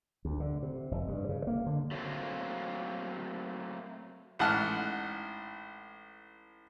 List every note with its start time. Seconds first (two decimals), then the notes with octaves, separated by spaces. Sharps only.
0.25 D2
0.40 D3
0.63 C3
0.91 F1
1.08 G2
1.29 C#3
1.47 A#3
1.66 D3
1.91 F#3 A3 A#3 C4
4.39 A1 G#2 F#5 A5 F6